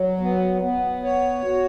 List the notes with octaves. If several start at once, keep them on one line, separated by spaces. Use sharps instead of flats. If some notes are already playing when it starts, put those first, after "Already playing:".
Already playing: F#3
B3
B3
C#5
F#4